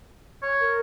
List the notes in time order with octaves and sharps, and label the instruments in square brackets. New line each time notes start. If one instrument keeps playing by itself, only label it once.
[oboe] C#5
[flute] A#4